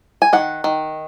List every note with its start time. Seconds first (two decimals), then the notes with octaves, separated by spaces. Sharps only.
0.22 G#5
0.33 D#3 F#5
0.64 D#3